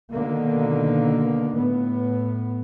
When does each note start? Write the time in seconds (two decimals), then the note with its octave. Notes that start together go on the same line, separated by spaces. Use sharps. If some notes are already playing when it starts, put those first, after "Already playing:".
0.12 B2 D3 D#3 A#3
1.56 A2 B3